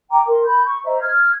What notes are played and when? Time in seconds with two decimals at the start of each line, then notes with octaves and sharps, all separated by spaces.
0.11 G5 A#5 D6
0.27 A#4 C6
0.45 B5 G6
0.66 C#6
0.85 C5 D#5 E5 A#5
1.01 F6 G#6